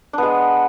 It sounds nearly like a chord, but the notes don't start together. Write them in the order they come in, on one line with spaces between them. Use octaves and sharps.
D4 B3 G#3